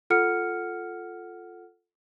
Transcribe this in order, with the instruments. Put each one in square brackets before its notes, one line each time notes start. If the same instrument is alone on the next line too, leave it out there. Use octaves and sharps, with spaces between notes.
[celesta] F4 A4 F#5 F6 C#7